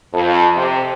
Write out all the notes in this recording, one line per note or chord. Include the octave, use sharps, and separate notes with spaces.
F2
C3